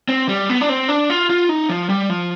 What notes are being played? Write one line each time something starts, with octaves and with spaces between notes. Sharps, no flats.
C4
G3
B3
D4
C4
D4
F4
F4
D#4
F3
G3
F3